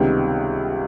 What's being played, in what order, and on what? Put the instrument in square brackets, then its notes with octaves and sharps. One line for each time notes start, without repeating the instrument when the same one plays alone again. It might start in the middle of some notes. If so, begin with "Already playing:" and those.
Already playing: [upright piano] C#2 C3 D#3 G3 B3